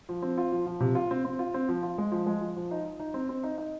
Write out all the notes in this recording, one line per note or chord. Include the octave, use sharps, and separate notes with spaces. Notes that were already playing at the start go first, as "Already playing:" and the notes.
F3
C4
F4
F3
F3
C3
F4
C4
C4
F4
C4
F3
F4
G#3
F3
G#3
F3
F3
D#4
D#4
D#4
C4
C4
D#4
D#4